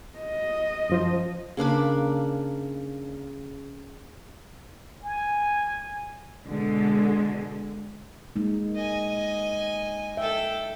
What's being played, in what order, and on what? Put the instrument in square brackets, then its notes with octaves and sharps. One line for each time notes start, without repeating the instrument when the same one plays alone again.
[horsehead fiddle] D#5
[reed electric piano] F#2 F3 C5
[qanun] C#3 A#3 D4 B5
[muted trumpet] G#5
[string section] B2 D3 G#3
[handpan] G#3 A#3 D#4
[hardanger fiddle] D#5 G#5
[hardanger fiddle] A4 G5 [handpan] E5